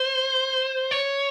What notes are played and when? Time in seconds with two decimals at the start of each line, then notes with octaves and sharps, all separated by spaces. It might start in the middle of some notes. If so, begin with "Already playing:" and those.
Already playing: C5
0.91 C#5